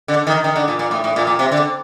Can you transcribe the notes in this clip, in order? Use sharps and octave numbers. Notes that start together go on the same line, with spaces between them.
D3
D#3
D#3
D3
A#2
A#2
A2
A2
A#2
A#2
C3
D3